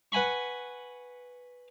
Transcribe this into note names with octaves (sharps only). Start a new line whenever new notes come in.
B4 F#5 G#5 B5 C#6